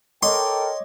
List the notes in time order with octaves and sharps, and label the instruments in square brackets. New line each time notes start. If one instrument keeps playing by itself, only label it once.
[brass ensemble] A4 A#4 G5 [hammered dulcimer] C#5 D#5 D6 [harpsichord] C6